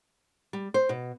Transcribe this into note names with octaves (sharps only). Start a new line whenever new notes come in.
G3
C5
B2